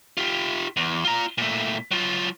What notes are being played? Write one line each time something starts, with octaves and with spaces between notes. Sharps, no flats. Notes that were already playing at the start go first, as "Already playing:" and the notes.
F4 G4
E2
F4 A#5
A#2 A3
F#3 F4